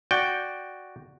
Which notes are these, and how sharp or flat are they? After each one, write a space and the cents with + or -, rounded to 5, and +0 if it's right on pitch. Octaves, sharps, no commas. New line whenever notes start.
F#4 +0 D5 +0 G5 +0